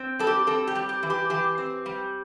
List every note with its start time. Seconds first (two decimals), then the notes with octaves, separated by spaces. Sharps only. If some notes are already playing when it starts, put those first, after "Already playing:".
Already playing: C4
0.19 G3 A4
0.27 G4
0.47 C4 A4
0.67 G4
0.75 G3
0.89 G4
1.03 E3
1.10 G4
1.30 E3 G4
1.58 C4
1.86 G3